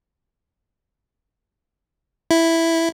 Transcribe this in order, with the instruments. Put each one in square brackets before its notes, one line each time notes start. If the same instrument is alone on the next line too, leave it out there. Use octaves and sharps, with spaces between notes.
[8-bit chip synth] E4